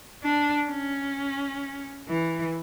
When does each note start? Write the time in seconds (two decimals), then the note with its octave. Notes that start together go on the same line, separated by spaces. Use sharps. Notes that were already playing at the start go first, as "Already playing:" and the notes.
0.24 D4
0.69 C#4
2.09 E3